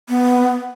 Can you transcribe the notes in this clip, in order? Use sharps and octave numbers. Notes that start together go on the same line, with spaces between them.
B3